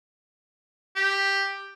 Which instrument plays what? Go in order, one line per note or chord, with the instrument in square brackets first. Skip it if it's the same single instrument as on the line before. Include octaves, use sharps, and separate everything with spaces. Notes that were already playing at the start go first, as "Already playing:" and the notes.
[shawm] G4